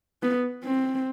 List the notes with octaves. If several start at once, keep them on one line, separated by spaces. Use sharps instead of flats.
B3
C4